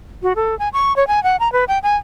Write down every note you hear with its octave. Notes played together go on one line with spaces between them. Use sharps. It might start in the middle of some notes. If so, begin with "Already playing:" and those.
F#4
A4
G#5
C#6
C#5
G#5
F#5
A#5
B4
G5
G#5